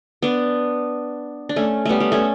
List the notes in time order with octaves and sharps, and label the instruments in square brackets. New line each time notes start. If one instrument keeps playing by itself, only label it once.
[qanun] B3 D4
D4
A3 C#4
G3 A3 B3
G3
A3 C#4